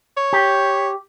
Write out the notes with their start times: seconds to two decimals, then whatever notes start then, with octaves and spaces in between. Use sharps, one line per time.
0.17 C#5
0.33 G4